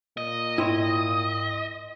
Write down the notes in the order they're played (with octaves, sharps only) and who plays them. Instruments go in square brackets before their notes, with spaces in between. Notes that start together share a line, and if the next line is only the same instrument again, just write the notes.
[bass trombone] A#2 [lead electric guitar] D#5
[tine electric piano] G#2 G5 C6 [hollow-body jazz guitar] E4 C#5